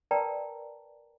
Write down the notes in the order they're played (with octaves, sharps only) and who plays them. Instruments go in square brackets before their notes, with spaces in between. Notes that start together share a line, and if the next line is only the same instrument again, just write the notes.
[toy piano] A#4 B4 D5 G5 A5 A#5